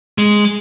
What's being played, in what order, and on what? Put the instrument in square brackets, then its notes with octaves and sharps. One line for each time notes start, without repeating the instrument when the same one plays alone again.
[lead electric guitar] G#3